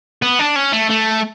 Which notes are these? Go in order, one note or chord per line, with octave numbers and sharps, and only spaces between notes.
B3
D4
C#4
A3
A3